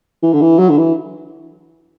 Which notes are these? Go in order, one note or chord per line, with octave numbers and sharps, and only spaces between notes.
E3
D3
E3
F#3
D3
E3